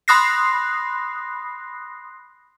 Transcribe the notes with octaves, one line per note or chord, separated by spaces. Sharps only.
B5 C6 D#6 F#6 A#6 C7